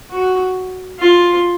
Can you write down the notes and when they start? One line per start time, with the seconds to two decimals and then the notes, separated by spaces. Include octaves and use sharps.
0.11 F#4
1.00 F4